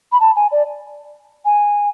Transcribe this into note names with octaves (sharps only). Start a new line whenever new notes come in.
B5
A5
G#5
D5
G#5